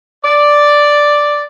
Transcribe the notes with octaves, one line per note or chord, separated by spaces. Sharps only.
D5